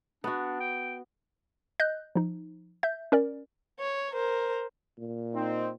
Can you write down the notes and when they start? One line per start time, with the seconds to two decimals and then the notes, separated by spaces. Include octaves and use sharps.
0.24 B3 D4 F#4
0.61 G5
1.80 D#5 F#6 G6
2.15 F3 D#4
2.83 E5 G6
3.12 C#4 A#4 D5
3.80 C#5
4.13 A#4 C5
4.98 A#2
5.35 C4 D#4